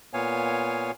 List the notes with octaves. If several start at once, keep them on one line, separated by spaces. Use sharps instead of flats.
A#2 B3 C#5 F5 G#5